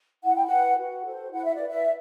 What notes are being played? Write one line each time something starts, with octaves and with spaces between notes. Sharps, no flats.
E4 F#5
G5
B4 F#5
F#4
A4 C5
E4 F#5
E5
B4 D5
E5